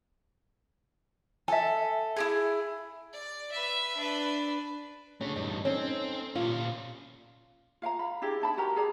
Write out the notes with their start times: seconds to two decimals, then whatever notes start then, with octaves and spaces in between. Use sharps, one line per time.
1.48 A4 E5 G#5
2.17 E4 G4 G#4
3.13 D5
3.52 B4 E5
3.96 D4 B4
5.21 C#3 A3 D4
5.36 E2 G2 D#4
5.65 C4 C#4 D#4 A4
6.35 A#2 C#4 F4
7.82 F4 F5 G5 A#5
7.99 B5
8.22 D4 E4 G4 G#4
8.41 D#4 A5 B5
8.57 F#4 G4 A#4 A#5
8.76 G#4 D5 A#5